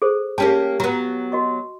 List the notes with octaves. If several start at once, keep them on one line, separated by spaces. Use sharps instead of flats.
G#4 A4 C5
A#3 C#4 G4 A5
F#3 B3 A#5
F#4 D#5 C#6